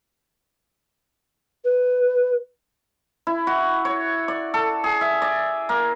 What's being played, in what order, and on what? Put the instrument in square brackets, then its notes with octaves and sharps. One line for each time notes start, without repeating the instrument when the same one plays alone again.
[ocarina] B4
[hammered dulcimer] E4
F#4
C#5
D5
A4
G#4
E5
D5
A#3